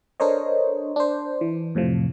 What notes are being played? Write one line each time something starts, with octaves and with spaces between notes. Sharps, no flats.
D4 A4 A#4 C5 C#5 D#5
D4 C5
E3
F2 A2 C3 F3